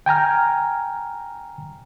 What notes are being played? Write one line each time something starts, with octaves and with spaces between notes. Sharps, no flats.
G5 G#5 A#5 F6